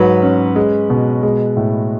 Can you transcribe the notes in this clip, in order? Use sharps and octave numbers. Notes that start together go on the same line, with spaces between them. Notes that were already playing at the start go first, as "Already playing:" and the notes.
Already playing: G#2 F#3 B4
C#4
G#3
B2
G#3
A2